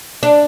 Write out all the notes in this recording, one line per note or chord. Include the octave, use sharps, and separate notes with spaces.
D4